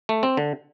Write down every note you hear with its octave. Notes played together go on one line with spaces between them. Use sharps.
A3
C4
D3